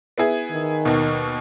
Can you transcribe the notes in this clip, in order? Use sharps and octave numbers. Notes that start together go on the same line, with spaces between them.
B3 E4 G#4
D#3
D#2 B2